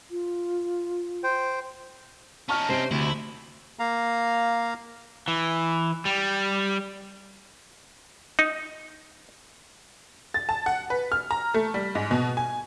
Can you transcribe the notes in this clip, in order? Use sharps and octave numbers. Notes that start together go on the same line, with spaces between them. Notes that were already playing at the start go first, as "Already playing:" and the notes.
F4
C5 G5
C#4 D#4 A5 C#6 F6
C3 C5 D7
D2 E4
A#3 F5 A#5
E3
G3
D#4
A6
A5
F#5
B4
F6
A#5
A3
G3
G#2
B2
G#5